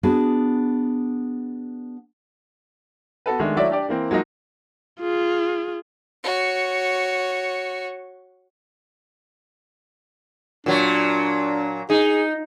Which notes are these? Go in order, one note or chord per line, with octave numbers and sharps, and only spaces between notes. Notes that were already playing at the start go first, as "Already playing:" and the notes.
B3 D4 F#4 G#4
B3 F#4 A4 B4
D#3 G#3 A3 D4
F#3 A3 E4 C#5 D5 E5
D4 G4 D5
E3 A#3 C4
F3 F#3 G#3 A#3 D#4
F4 G#4
F#4 C#5
A#2 F#3 D4
D#4 G#4